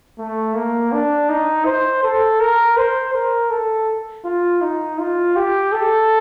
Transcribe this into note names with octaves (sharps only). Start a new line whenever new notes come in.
A3
A#3
D4
D#4
C5
A4
A#4
C5
A#4
A4
F4
D#4
F4
G4
A4